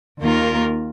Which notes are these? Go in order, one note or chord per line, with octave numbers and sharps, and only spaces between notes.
D#2 D#3 A#3 F4 A#4